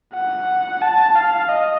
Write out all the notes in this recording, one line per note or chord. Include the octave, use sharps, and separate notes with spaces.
F#5
A5
F5
D#5